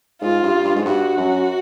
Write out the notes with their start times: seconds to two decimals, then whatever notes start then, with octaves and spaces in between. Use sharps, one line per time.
0.21 G#2 F4
0.43 G2
0.65 G2
0.76 G#2
0.86 G2 F#4
1.17 F#2